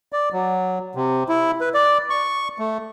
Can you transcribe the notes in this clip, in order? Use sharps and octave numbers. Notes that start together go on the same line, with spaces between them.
D5
F#3
C3
E4
B4
D5
C#6
A3